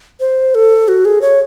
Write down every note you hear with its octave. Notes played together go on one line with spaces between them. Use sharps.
C5
A4
F#4
G#4
C#5